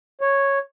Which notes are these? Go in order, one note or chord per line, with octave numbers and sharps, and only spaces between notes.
C#5